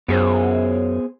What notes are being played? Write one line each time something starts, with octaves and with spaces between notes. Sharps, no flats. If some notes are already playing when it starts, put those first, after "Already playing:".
F#2 B3 G#4 C5